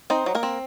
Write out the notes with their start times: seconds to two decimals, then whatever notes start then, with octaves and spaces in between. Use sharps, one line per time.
0.10 C4 D#4 C5
0.26 F#3
0.35 A#3 A#4
0.43 C4